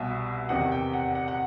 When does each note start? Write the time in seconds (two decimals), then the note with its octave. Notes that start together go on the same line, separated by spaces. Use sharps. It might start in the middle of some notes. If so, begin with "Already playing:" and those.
Already playing: C2 B2 E5
0.49 E2 C3 D#3 F#5
0.72 G5
0.93 F#5
1.15 F#5
1.28 F#5